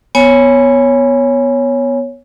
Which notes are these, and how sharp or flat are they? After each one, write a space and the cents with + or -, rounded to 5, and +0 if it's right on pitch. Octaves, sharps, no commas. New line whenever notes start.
B3 -5 C#5 +0 G#5 +0